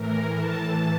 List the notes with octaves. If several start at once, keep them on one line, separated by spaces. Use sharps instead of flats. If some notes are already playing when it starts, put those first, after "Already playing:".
Already playing: A2 E3 A#4
A2 E3 A5